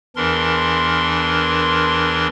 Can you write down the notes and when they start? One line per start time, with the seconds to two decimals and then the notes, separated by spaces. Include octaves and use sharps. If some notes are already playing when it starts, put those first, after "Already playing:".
0.16 E2 E3 D4 A#4 C6